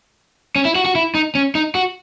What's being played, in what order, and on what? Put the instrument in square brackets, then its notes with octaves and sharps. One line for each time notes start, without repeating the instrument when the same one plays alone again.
[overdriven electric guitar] C#4
E4
F#4
F#4
E4
D#4
C#4
D#4
F#4